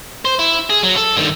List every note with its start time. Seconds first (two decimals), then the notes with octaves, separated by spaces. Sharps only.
0.25 C5
0.39 E4
0.70 G#4
0.83 F#3
0.96 A4
1.16 G2 D#3